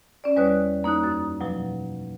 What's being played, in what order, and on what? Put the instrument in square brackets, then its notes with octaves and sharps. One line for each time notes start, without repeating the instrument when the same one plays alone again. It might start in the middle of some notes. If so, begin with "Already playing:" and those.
[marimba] C#4 D5
E2 G3 B4 C#5 D#6 F#6
A#3 D#4 D#6 F#6
F#2 D#6
B2 F3 F#3